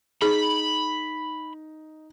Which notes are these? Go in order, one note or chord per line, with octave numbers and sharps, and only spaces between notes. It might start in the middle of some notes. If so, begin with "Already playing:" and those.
D#4 G#4 B5